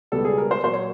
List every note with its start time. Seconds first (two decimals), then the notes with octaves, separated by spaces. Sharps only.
0.12 C#2 B2 G3 B3 A4
0.25 G#4
0.38 A#4
0.51 C5
0.64 A#2 F#3 A#3 C5
0.73 C#5